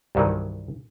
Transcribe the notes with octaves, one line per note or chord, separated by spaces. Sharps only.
C2 G2 D#3 E3 F#3